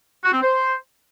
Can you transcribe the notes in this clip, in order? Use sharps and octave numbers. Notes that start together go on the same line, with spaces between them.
F#4
C4
C5